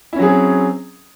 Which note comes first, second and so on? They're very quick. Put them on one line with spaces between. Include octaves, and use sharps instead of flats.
E4 C#4 F#3 G#4 C4